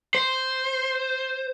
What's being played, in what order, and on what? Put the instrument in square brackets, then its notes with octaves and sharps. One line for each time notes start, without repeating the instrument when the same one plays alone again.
[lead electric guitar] C5